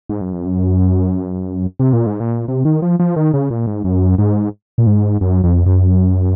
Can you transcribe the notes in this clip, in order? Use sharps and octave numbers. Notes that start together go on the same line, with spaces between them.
G#2
F#2
F2
F#2
C3
A#2
G#2
A#2
C3
D#3
F3
F3
D#3
C#3
A#2
G#2
F#2
G#2
A#2
G#2
F#2
F2
F#2